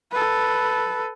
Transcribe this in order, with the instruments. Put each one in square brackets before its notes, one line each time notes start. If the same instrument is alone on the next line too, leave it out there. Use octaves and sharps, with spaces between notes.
[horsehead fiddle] A4 B4